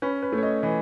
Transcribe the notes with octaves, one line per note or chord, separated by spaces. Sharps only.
C#4 B4
B4
A3
C#5
D#5
E3 D#5